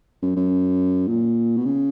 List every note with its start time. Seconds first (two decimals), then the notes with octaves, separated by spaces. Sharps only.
0.22 F#2
0.36 F#2
1.08 A#2
1.57 B2
1.65 C#3